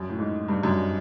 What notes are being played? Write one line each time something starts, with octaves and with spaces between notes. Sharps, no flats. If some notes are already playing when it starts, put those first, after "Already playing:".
Already playing: F#2
A2
G#2
G2
F#2